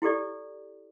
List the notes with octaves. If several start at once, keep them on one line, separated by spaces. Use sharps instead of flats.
E4 G4 A4 D5